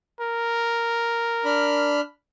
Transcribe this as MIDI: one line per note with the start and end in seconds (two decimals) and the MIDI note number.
0.20 2.00 70
1.45 2.01 62
1.45 2.01 83
1.45 2.01 89